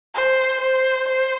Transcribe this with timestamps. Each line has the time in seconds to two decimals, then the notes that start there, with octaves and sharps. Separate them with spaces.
0.15 C5
0.61 C5
1.09 C5